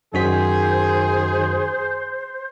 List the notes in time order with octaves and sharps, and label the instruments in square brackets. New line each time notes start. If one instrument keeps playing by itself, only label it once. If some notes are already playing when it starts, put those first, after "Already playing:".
[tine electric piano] F#2 F#4 B6 [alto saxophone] D#3 [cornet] G#4 [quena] C5